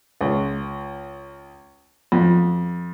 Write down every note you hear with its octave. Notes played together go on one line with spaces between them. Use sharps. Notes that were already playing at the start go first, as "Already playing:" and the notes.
C#2
F2